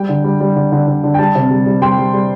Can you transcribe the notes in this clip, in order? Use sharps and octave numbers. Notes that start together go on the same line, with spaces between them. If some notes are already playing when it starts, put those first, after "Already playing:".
Already playing: G3 G5
D3
G3
G3
D3
D3
D3
D3
G5
G3 A5
C3
G3
G3
G3 G5 C6
G3
G3